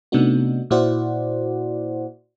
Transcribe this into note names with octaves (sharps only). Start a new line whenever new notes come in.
C3 A3 B3 D4 D#4 F#4
A#2 E4 F#4 C5 D5 F#5